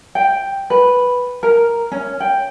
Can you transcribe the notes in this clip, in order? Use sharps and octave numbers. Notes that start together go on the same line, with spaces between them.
G5
B4
A#4
C#4
G5